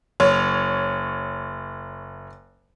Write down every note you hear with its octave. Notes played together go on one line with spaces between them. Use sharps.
F#1 C#5